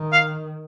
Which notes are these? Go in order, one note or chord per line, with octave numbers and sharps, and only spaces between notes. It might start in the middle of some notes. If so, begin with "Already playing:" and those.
Already playing: D#3
F5